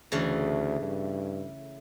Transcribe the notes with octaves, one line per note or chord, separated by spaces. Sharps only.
D2 C#3 E3 A3
G2